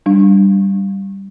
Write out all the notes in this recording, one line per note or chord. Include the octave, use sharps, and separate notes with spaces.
G3 D4